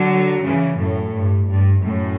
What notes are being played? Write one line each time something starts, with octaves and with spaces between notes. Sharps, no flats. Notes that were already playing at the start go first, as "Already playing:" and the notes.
Already playing: D3 F#3
C#3 E3
F#2 A2
G2
G2
F#2 A2